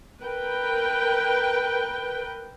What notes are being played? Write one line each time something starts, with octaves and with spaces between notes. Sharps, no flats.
A#4 B4 G5